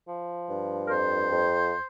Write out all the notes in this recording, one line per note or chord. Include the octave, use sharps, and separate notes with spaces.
F3
G2
A#4
F2 C5
F2